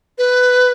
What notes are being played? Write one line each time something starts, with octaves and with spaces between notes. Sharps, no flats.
B4